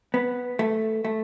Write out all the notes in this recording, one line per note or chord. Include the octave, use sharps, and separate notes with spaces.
B3
A3
A3